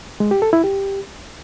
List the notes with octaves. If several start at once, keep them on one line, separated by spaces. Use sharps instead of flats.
G#3
G4
A4
E4
G4